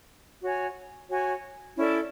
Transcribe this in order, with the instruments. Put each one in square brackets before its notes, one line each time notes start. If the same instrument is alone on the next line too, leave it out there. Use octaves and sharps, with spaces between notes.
[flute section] F#4 C#5 G#5
F#4 C#5 G#5
C#4 E4 A4 D5